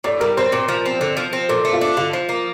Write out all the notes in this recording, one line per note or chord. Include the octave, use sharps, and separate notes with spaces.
A2 D5
G3 A#4
C4 C5
A#2 C5
F3
C4
D3
F3
C4
A#2 A4
A3
F4
D4
D3 F4
F3
A#3